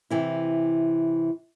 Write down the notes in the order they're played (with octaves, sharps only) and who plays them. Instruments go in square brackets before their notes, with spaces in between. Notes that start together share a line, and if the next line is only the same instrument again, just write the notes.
[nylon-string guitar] C3 E3 E4